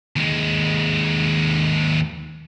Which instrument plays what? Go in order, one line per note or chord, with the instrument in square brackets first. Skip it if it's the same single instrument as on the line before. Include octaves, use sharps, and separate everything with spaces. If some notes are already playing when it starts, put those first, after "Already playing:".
[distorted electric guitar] D#2 G#3